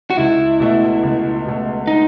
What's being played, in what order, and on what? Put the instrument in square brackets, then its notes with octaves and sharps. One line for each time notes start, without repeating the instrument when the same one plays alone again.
[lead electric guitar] F#4
[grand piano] C#2 [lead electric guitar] E4
[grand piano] B2 A3
C#2
B2 A3
[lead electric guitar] D#4